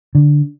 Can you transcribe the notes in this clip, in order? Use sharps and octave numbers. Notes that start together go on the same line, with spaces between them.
D3